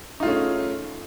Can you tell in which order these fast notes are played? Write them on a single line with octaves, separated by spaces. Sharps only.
D#4 F4 A3 C#4 G#4